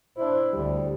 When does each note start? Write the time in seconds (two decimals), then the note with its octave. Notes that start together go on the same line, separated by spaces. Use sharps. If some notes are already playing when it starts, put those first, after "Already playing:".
0.17 D4 E4 C5
0.53 D2 G3